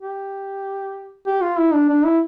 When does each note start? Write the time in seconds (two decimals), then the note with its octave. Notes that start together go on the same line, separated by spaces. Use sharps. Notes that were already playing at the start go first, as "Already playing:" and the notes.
0.01 G4
1.26 G4
1.42 F4
1.57 E4
1.73 D4
1.89 D4
2.05 E4